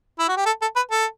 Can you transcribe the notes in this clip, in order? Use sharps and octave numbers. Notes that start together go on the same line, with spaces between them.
E4
F#4
G4
A4
A4
B4
A4